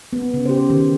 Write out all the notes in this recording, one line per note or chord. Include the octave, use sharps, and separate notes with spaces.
B3
C#3
G4 C5
D#3